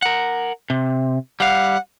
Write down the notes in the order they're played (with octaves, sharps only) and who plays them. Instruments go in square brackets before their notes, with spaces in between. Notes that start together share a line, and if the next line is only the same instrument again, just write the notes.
[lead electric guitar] A#4 F#5
C3
[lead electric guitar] G3 F5 [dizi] F#5